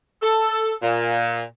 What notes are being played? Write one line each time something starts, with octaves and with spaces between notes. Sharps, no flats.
A4
A#2